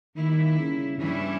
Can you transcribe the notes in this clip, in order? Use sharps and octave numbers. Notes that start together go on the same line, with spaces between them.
D#3 G3 A#3 E4
C#3
G2 E3 G3 C#4 E4